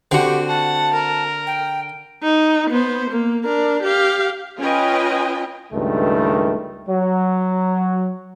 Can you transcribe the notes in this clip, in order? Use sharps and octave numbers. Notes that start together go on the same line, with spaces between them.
D3 C4 F#4 G4
F#5 A5
A#4
G5
D#4
B3 C5
A#3
D4 A#4
G4 F5
C#4 F4 B4 D#5 G5 G#5
C#2 G2 D#3 A3
F#3